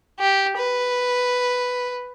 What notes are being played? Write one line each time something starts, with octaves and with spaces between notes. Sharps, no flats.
G4
B4